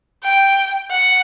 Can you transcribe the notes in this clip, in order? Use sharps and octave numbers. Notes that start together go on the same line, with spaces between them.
G5
F#5